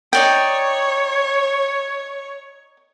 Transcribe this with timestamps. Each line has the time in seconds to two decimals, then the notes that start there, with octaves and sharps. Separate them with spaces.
0.13 D#4 C#5 D5 G5